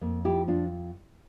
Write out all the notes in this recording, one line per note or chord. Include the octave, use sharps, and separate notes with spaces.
F2 A#3
F3 E4 G4
F2 D4 F4